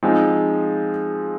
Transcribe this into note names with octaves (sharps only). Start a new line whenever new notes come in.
F3 G#3 C4 D#4